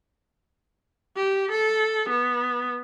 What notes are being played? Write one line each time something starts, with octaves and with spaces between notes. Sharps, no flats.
G4
A4
B3